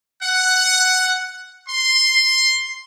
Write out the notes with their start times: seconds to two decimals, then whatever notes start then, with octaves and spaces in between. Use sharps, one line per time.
0.22 F#5
1.68 C6